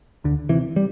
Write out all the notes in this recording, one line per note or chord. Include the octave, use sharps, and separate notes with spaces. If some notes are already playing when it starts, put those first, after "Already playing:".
D2 D3
C3 E3
G3